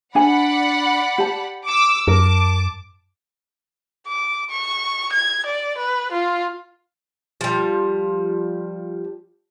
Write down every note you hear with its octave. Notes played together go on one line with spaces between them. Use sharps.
D4 D5 F#5 G#5 B5
G4 A5
D6 E6
F#2 A#4 A5 D6
D6
C#6
G#6
D5
B4
F4
F3 G3